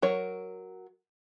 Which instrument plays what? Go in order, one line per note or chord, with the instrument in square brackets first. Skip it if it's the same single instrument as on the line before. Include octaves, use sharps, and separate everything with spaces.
[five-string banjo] F#3 A#4 C#5